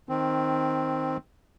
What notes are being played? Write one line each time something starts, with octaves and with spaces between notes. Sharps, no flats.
D#3 C4